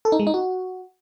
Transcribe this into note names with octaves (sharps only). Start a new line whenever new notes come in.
A4
D#4
G#3
D#4
F#4